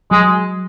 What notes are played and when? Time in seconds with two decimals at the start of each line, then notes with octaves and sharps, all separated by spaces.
0.11 F#3 G#3